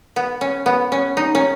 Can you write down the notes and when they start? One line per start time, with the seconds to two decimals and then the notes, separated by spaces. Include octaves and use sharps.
0.16 B3
0.41 C#4
0.66 B3
0.92 C#4
1.17 D#4
1.35 C#4